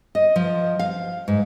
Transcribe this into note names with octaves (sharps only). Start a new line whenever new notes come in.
D#5
F3
F5
G#2